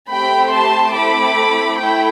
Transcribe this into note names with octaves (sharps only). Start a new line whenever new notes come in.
A3 C4 G4 G5 B5
A5 C6
A3 C4 E4 A4 B5 D6
A3 E4 G5 B5